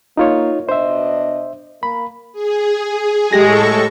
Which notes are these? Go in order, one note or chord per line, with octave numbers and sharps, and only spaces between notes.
A#3 D#4 F4 C#5
B2 D4 C5 D#5 E5
A#3 B5
G#4
A2 G#3 G4 A4 C#6 A#6